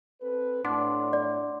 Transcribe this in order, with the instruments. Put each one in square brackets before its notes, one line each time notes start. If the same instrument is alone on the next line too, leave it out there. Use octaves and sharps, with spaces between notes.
[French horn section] C4 A4 B4
[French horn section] A2 [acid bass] D4 [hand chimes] F#5 C6 D6
[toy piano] D5